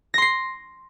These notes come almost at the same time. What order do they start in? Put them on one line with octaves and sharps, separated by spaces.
A#6 C6 C7